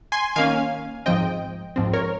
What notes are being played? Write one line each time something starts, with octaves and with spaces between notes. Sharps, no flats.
G#5 C6
D#3 A#3 C#4 F5 G#5
G#2 F3 C4 D#5 G5
G#2 F3 C4
A#4 C#5